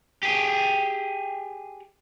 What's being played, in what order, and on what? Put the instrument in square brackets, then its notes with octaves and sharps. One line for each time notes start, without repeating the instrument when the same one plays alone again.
[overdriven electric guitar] G4 G#4